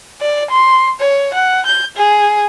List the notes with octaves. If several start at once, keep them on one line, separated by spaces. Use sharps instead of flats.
D5
C6
C#5
F#5
G6
G#4